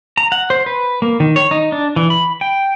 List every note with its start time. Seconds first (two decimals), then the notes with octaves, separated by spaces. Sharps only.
0.17 A#5
0.32 F#5
0.50 C5
0.66 B4
1.02 A#3
1.20 D#3
1.36 C#5
1.51 D#4
1.72 D4
1.96 E3
2.10 B5
2.41 G5